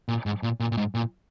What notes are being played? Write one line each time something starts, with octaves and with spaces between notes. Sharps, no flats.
A#2
G#2
A#2
A#2
A#2
G#2
A#2